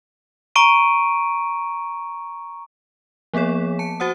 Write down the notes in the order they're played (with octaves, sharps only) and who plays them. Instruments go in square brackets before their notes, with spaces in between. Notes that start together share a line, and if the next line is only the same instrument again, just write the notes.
[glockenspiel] A#5 C#6 D7 D#7
[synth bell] F3 A#3 B3 G#4 C#5
A5 C#7
F#4 C5 F#5 D#6